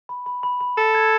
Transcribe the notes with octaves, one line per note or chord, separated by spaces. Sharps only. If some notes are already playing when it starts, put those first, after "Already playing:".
B5
B5
B5
B5
A4 E6
G#6